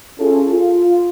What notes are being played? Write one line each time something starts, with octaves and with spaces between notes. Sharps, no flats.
C#4 E4 F4 G#4 A4
F4